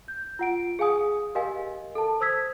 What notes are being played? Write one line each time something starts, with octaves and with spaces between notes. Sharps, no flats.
G6
F4 F#5 D7
G#4 F5 G#5 D#6
G4 A#4 D#5 F5 G#5
A4 A5
C5 D#6 E6 G#6 B6